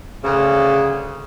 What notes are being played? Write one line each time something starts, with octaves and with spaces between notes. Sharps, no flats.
D2 C#3